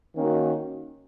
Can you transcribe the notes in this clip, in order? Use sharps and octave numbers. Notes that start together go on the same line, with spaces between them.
D#3 A#3 C#4 F#4